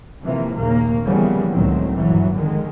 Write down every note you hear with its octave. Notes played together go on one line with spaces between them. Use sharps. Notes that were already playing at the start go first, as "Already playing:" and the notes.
C3 E3 F3 A#3
F1 A#1 D#2 C#3 A#3
C#3 E3 F3 G3 A#3 B3
C#2 A2 D3 D#3 F#3 C4
G#1 G2 A#2 E3 F#3
F2 D3 D#3 G#3